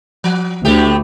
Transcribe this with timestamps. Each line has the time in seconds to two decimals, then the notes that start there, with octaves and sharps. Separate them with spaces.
0.24 F3
0.65 D2 A2 A3 G4